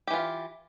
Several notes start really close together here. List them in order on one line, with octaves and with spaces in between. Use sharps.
G4 E3 F4